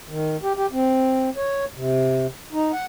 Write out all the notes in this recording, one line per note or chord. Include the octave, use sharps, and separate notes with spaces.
D#3
G4
G4
C4
C#5
C3
D#4
F#5